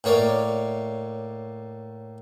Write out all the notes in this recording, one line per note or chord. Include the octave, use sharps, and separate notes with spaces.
A2 A#3 C#5 D5 D6